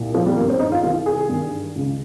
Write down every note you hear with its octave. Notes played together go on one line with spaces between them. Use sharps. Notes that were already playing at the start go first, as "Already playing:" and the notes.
Already playing: C2 A#2
F3
G3
G2 D#3 A#3
C4
D#4
F4
C2 C3 D#3 F4
G#4
G2 D#3
C#2 C#3